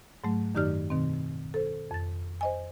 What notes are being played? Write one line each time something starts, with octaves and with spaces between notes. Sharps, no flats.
G#2 F#3 A3
F#2 D#3 D#4 G4 D5 F6
B2 D#3 C4
A4 C5
F2 A6
C5 D#5 G#5